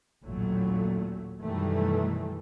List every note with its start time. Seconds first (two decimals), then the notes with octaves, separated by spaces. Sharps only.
0.24 A1 D#2 A#2 F#3 A3
1.42 F#2 B2 D#3 E3 G3 A3